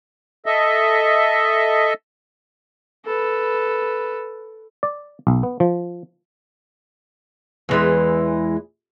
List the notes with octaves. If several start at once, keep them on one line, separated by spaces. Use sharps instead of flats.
A4 D#5 E5
A4 B4
D5
B1
B3
F3
E2 E3 G#3